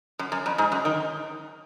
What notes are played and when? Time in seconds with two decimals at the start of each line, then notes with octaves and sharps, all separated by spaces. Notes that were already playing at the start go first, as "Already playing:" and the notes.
0.19 F#2
0.32 F#2
0.46 F2
0.58 G#2
0.72 F#2
0.85 D#3